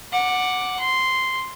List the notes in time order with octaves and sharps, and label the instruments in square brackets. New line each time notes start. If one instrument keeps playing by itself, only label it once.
[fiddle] F#5 D6
C6